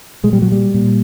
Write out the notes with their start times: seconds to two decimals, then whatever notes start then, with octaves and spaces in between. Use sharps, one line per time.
0.23 A#2 G#3
0.33 G3
0.42 F#3
0.52 G3
0.74 A#2